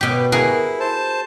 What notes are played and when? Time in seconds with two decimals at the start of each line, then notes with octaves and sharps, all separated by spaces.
0.01 B2 G4 D6
0.17 B4
0.32 E4 F#4 G#4 A#4
0.80 C5 A5